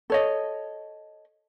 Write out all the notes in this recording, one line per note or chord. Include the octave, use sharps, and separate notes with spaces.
A4 C#5 D#5